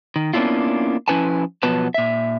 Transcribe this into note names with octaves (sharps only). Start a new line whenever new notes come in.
D#3
A#3 B3 C#4 D4 E4 F4
F3 C#4 E4 B4 G#5 A5
B2 F3 F#3 B3 B4 A5
A#2 E5